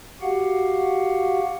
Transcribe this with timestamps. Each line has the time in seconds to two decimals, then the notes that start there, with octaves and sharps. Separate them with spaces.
0.22 F#4 G4 F5 F#5